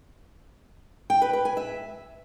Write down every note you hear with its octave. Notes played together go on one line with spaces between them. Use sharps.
G5
B4
B4
G#5
E5